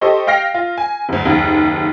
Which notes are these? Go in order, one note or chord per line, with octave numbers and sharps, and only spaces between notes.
G4 A4 C5 D#5 C#6
F5 G5 F6 A#6 C7
F4
G#5
F#1 D2
F#1 D#2